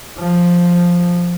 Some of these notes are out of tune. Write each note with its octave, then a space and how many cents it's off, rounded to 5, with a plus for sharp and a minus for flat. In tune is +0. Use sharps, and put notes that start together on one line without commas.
F3 +5